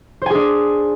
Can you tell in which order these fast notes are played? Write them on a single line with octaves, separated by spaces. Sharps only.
C5 G#5 G#4 D4